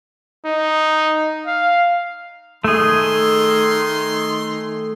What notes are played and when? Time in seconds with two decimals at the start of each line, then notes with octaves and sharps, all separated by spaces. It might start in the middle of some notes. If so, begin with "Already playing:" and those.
0.45 D#4
1.47 F5
2.64 D#3 A3 G#4 C6